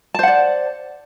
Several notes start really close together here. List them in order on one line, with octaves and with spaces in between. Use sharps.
A5 C5 F#5 D5